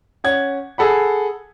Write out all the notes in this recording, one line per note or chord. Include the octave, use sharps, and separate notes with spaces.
C#4 C#5 F#5 G#6
G#4 A4 F#5 B5